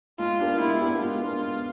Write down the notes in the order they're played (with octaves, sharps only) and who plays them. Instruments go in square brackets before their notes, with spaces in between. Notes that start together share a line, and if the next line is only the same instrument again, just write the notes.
[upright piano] G#3 [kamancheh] F4
[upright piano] B3 D4 G4 A#4
[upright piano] G#3 [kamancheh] E4
[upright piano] B3 D4 G4 A#4
[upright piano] G#3 [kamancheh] F4
[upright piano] B3 D4 G4 A#4
G#3